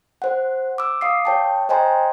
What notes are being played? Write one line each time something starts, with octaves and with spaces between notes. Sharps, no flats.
C5 F#5
D6 E6
F5 D6 D#6 C7
C#5 G5 A5
C5 D#5 G5 G#5 A#5 C6